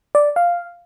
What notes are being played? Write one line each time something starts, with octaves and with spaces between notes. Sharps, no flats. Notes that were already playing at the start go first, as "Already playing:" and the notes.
D5
F5